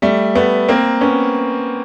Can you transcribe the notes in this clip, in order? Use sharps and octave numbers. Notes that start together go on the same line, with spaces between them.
G3 A3
A3 B3
A#3 C4
B3 C#4